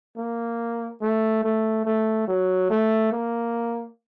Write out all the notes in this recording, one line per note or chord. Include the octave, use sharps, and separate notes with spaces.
A#3
A3
A3
A3
F#3
A3
A#3